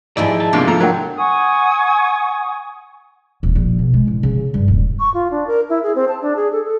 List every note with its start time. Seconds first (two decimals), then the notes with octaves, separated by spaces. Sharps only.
0.17 G#2 E3 F3 D#4 E4 G4 D5 G#5
0.40 E5 A5
0.53 E2 G#2 C3 A#3 D4 F4
0.67 F3 A4 A#5
0.80 F#3 A#4 F#5 G5
1.17 F#5 G#5 C#6 D#6
3.43 D#1
3.55 A#1
3.79 B2
3.94 G#3
4.07 A1
4.23 C#3
4.54 G2
4.68 D#1
4.99 C#6
5.14 F4
5.31 D4
5.47 A#4
5.69 E4
5.83 G#4
5.95 C4
6.08 A5
6.22 D4
6.36 G#4
6.52 A4
6.65 A4